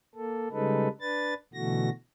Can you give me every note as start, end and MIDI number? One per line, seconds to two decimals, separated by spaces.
0.15 0.48 58
0.15 0.48 69
0.52 0.88 49
0.52 0.88 55
0.52 0.88 56
0.52 0.88 63
0.52 0.88 69
0.52 0.88 71
1.01 1.34 62
1.01 1.34 71
1.01 1.34 93
1.54 1.89 47
1.54 1.89 50
1.54 1.89 52
1.54 1.89 57
1.54 1.89 66
1.54 1.89 94